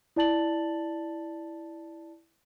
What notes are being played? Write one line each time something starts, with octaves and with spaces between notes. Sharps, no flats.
E4 D5 A5 A6 F#7